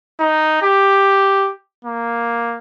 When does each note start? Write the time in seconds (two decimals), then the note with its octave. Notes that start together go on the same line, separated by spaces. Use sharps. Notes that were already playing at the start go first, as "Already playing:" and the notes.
0.20 D#4
0.62 G4
1.85 A#3